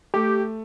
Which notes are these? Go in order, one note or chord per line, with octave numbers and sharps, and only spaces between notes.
A3 G4